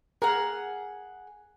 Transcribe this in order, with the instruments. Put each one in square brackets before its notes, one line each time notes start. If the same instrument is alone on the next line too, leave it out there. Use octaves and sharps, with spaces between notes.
[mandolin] G#4 F#5 [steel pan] A#4